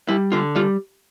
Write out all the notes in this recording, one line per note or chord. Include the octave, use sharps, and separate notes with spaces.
G3 E4
D3 F4
G3 F4